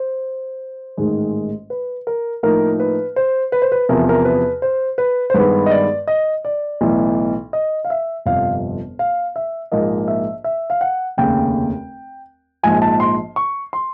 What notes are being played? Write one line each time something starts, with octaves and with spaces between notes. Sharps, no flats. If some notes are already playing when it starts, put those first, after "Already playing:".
Already playing: C5
A1 G#2 D#3 G#3
B4
A#4
A2 F3 A#3 D#4 A#4
B4
C5
B4
C5
B4
E2 C3 F3 A#4
A#4
B4
C5
B4
C5
G2 D#3 G#3 B3 B4
D#5
D5
D#5
D5
B1 A2 E3
D#5
F5
E5
G1 F2 C3 F3 F5
F5
E5
A#1 G#2 F3 A#3 D#5
E5
E5
F5
F#5
F1 D#2 C#3 G5
A#1 G#2 F3 G#5
A5
C6
C#6
C6